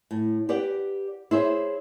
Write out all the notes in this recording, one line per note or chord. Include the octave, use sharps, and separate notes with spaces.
A2
G4 B4 D5 F#5 G5
E4 G#4 C5 C#5 E5